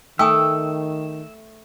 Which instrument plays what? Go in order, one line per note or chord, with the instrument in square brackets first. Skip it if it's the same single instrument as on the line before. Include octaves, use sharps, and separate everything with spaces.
[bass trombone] D#3 [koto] A3 [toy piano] G5 G#5 D#6 [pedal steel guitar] E6